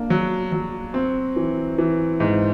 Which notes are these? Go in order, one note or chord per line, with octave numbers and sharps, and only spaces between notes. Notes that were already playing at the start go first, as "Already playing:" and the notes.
Already playing: A#3 D4
F#3
F#3
C4
E3
E3
G#2